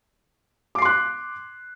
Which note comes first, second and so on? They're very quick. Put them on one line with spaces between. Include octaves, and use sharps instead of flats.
D6 C7 C6 F#6